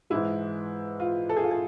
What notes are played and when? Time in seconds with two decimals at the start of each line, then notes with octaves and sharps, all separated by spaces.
0.10 G#2 E3 G#3 E4
1.00 F4
1.29 A4
1.37 G#4
1.44 F4
1.51 G#4